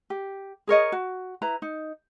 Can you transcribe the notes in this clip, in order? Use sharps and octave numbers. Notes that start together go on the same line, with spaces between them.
G4
G#4 A#4 C#5 D#5
F#4
E4 B4 A#5
D#4